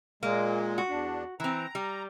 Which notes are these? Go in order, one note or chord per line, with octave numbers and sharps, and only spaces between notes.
A#2 G#3 A#3
F#4
E2 D4
E3 C4 A#5
G3